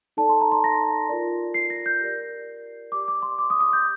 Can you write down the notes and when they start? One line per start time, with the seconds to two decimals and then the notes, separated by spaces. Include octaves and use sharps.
0.17 D#4 A4 D5 A5
0.29 C6
0.41 A#5
0.52 C6
0.64 A#6
1.09 F4 A#4 D5
1.54 C7
1.70 A#6
1.86 G6
2.01 G4 A#4 D5
2.92 G4 D5 D6
3.08 D6
3.22 C6
3.38 D6
3.50 D#6
3.61 D#6
3.73 G6